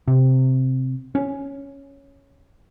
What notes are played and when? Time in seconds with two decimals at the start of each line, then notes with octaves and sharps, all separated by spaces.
0.08 C3
1.15 C#4